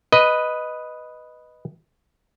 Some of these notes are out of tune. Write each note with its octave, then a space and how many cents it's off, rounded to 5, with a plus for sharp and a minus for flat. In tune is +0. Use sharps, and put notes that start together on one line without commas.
B4 +0 D#5 +0